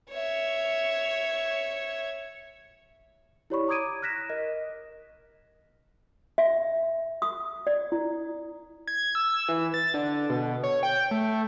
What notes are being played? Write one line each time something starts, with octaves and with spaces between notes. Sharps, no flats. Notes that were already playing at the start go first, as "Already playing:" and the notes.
C#5 E5
E4 G4 C#5 D5 B5 C#6
A#5 D6 D#6 G#6 D7 D#7
F6 F#6 A#6 B6 E7
A#4 D#5
E5
D#6
D5
E4
G#6
E6
E3
A6
D3
B2
C#5
G5
A3